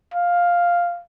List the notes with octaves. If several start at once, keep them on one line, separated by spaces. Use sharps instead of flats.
F5